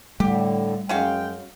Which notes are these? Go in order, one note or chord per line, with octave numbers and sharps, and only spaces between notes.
A2 D3 G3 A3 G4
F#2 G#3 C#4 F#4 F5 G5